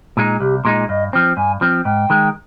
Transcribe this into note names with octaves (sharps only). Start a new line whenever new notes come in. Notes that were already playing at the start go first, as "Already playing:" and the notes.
A#2 G#3 D#4
C2 G4
A#2 G#3 D#4
G2 D#5
F3 C4
G2 G#5
F3 C4
G#2 G5
D#3 G#3